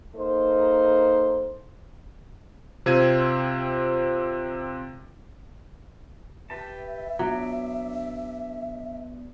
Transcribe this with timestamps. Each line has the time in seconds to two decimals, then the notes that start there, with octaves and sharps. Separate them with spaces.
0.15 A#3 D#4 A4 C5
2.86 C3 C4 F4 G#6 D#7
6.50 G4 B4 E5 A5
7.19 F#3 B3 D4